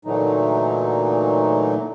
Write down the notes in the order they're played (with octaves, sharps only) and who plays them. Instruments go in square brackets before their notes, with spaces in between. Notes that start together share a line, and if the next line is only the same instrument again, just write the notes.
[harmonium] A#2 D3 E3 F#3 A3 D#4